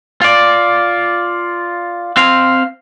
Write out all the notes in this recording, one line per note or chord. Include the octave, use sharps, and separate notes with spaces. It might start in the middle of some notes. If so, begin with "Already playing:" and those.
F4 D5
C4 F5